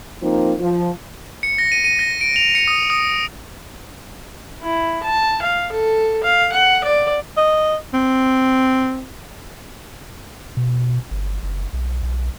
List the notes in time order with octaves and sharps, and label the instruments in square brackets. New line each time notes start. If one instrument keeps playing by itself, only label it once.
[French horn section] F3 A#3 C4 D#4
F3
[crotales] C#7
A#6
D#7
D#7
A#6
D7
F7
C#7
D#6
D#6
[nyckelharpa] E4
A5
F5
A4
F5
F#5
D5
[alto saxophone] D#5
C4
[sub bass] B2
G1
F#1
B1
B1